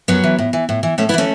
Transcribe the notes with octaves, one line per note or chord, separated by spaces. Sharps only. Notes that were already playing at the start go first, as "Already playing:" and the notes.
F#2 F#3 B3
E3
A2
E3
A2
E3
A2 A3 C#4
B3 E4
E3 A3 C#4